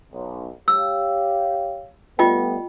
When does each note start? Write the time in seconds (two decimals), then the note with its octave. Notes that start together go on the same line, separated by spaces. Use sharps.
0.12 B1
0.68 G4 C#5 F5 E6
2.19 G3 A3 B3 F4 D#5 G5